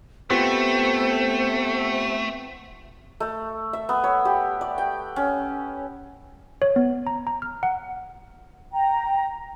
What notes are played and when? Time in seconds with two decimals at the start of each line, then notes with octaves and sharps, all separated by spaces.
0.30 A3 B3 C4 F4 G4 C5
3.20 A3
3.73 E5
3.89 B3
4.04 C#5
4.25 G4
4.61 D5
4.78 G5
5.16 C#4
6.62 C#5
6.76 B3
7.07 A#5
7.27 A#5
7.42 F6
7.63 F#5
8.72 G5 A#5